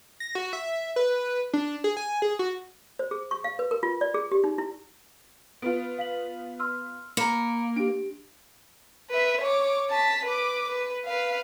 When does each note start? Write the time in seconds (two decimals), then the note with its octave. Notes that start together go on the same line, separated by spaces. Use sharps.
0.20 A#6
0.35 F#4
0.53 E5
0.96 B4
1.53 D4
1.84 G#4
1.97 G#5
2.22 G#4
2.39 F#4
2.99 C5
3.11 G#4
3.31 C#6
3.44 F5
3.59 B4
3.71 A#4
3.83 F4
4.01 D5
4.14 G#4
4.32 G4
4.44 D#4
4.58 E4
5.62 B3 F4 D7
5.98 F5 B6 F#7
6.59 C6 E6 F6
7.17 A#3 A#5 B5 C#7
7.76 D4 G4 D7
9.10 B4 E5
9.41 C#5 D6
9.90 A5 B6
10.25 B4 D6
10.69 B4
11.06 B4 F5